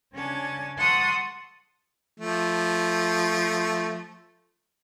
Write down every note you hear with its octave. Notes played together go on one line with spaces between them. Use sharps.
C#3 C#4 D4 G#5 A5
F#5 A5 C6 C#6 D#6 E6
F3 A3